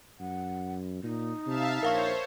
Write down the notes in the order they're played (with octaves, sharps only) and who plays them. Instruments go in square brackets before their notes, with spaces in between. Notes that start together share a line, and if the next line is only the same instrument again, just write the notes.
[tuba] F#2 [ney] F#5
[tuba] A#2 [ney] D#4
[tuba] C3 [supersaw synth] E5 F5 A5
[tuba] A#1 [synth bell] A#4 F5 C#6 [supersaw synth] C5 C#5